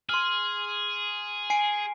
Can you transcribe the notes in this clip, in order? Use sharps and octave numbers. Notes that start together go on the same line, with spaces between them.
G#4 C6 F6
G#5 C7 D7